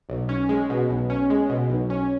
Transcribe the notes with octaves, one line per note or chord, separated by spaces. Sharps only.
B1
C#4
G#3
B2
B1
C#4
G#3
B2
B1
C#4